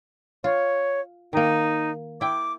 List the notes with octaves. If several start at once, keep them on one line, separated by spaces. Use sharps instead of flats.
F4 C#5
D#3 A#3 D#4
E4 G5 D6